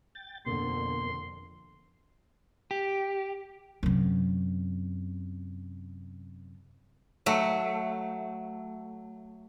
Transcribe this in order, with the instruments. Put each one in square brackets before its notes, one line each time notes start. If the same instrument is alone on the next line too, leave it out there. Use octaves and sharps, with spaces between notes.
[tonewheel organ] G5 A6
[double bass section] F2 D3 [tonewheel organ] B2 A#3 [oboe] C6
[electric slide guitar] G4
[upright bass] F#2 C3
[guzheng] F#3 A3